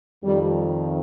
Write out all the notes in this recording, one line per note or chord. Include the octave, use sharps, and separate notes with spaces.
F2 D#3 G3